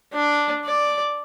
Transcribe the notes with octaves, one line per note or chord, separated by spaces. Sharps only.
D4
D5